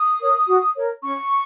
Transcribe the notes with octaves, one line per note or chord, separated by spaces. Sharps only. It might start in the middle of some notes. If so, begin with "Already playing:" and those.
Already playing: D#6
A#4 C#5
F#4
A#4 C#5
C#4 C#6